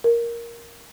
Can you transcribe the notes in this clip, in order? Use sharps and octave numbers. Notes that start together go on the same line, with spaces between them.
A#4